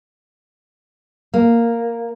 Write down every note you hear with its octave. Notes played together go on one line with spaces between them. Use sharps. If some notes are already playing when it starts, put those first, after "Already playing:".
A#3